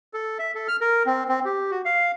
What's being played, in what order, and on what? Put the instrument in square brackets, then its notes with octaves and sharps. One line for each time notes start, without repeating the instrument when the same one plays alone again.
[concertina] A4
E5
A4
F6
A#4
C4
C4
G4
F#4
F5